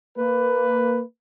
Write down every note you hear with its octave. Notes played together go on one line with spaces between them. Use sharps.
A#3 B4